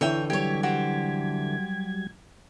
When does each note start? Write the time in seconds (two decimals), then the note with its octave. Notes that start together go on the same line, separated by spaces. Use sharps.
0.01 D3 E3 E4 C#5 E5 G5
0.30 F#3 G3 G4 C#5 G#6
0.63 F#4 G4 C5